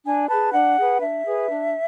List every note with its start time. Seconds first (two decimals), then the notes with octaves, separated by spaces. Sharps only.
0.05 D4 G#5
0.29 G#4 B4 A5
0.53 D4 F#5
0.77 G#4 B4
1.01 D4 E5
1.25 G#4 B4
1.50 D4